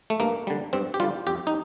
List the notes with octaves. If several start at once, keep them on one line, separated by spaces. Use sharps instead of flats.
A3
G2 A#3
D3 G3
G2 C4
G4
D3 G3 F4
F2 G4
D#4